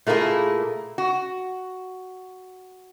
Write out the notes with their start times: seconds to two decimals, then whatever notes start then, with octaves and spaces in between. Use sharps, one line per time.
0.07 A#2 A3 A#3 E4 G#4
0.98 F#4